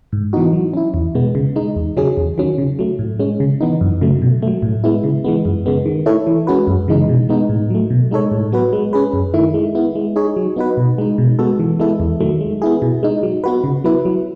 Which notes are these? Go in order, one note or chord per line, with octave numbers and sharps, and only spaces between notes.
G#2
E3 B3 D#4 F#4
F#3
C#4 E4
E2
B2 G#3 B3
C#3
G#3 D#4
E2
C#3 F#3 C#4 G#4
E2
D#3 F#3 C#4
C#3
F#3 A3
A2
G#3 C#4
C#3
E3 B3 D#4
F#2
C#3 F#3 A3
B2
F#3 A3
A2
G#3 B3 E4
C#3
E3 G#3 B3
F#2
C#3 G#3 B3
D#3
A3 E4 A4 C#5
E3
G#3 C#4 F#4 B4
F#2
C#3 E3 G#3 D#4
B2
G#3 B3 D#4
A2
F#3 A3
B2
G#3 D#4 A4 C#5
A2
F#3 B3 F#4 B4
G#3
C#4 G#4 B4
F#2
D#3 A3 E4
G#3
B3 E4
G#3
D#4 G#4 C#5
F#3
B3 D#4 F#4 B4
B2
G#3 D#4
B2
G#3 B3 F#4 A4
E3
G#3 B3 E4 A4
E2
D#3 F#3 A3
G#3
B3 E4 G#4
B2
G#3 D#4
F#3
B3 F#4 B4
C#3
F#3 B3 E4 B4
F#3